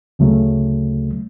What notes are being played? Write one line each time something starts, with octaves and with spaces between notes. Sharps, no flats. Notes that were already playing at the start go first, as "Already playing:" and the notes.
D2 C#3 F#3 A3